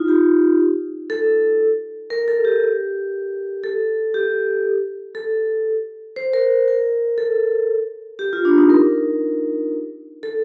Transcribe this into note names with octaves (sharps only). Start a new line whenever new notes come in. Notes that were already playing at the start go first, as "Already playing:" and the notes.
Already playing: D#4 F4
G4
A4
A#4
A4
G4
A4
G4
A4
C5
A#4
A#4
A4
G4
F4
D4
D#4
A#4
A4